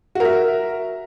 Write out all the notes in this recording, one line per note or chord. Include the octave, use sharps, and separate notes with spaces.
F#4 A#4 E5